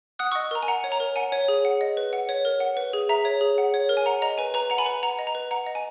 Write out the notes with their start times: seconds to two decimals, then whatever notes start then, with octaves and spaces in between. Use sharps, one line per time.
0.19 F#5 D#6 F#6
0.31 C#6 E6
0.35 D#5
0.51 A#4 A#5
0.63 G#5
0.68 F#5 A#5
0.84 C#5
0.92 A#5
1.00 A#4
1.16 F#5 G#5
1.32 C#5
1.48 G#4
1.65 F#5
1.81 D#5
1.97 B4
2.13 F#5
2.29 C#5
2.45 A#4
2.60 F#5
2.77 B4
2.93 G#4
3.09 E5 A#5
3.25 C#5
3.41 G#4
3.58 F#5
3.74 C#5
3.89 A#4
3.97 G#5
4.06 F#5 A#5
4.22 D#5 A#5
4.38 B4 G#5
4.54 B4 A#5
4.70 F#5 A#5
4.78 G#5 B5
4.86 B4
5.03 F#5 A#5
5.19 D#5
5.27 A#5
5.35 B4
5.51 F#5 A#5
5.67 D#5
5.75 G#5